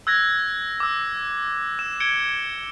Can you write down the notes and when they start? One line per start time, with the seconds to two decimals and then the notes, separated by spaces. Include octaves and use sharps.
0.07 E6 F#6 G#6 A#6
0.80 D6 E6
1.79 E6 E7
2.00 G#6 C#7 D7 G7